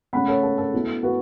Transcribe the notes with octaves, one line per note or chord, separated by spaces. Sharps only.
C#3 A3 C#4 F#5 B5
A4 C#5
A4
A4
B2 B3 E4
F#4 B4